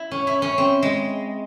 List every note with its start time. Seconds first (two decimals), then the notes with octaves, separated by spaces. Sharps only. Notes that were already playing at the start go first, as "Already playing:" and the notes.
Already playing: E4
0.11 C#4
0.27 E4
0.42 C#4
0.58 C4
0.83 G#3